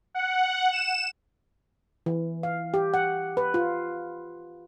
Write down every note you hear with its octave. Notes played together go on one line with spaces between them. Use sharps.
F#5
E7
E3
F5
G4
F#5
B4
F4